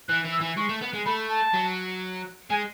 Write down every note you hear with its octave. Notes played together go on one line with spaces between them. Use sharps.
E3 F#6
E3
E6
E3
G#3 C#6
A3
B3
G#3
A3 B5
A5
F#3
G#3 G#5